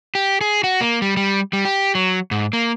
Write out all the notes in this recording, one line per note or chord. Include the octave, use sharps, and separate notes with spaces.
G4
G#4
F#4
A#3
G3
G3
G3
G4
F#3
G#2
A#3